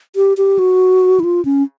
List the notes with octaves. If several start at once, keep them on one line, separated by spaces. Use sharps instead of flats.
G4
G4
F#4
E4
F4
C#4